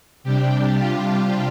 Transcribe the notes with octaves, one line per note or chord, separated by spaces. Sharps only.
C3 G3 D4 G4
F4